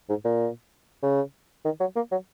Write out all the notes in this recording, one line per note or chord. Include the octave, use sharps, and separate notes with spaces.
G#2
A#2
C#3
D#3
F#3
A#3
F#3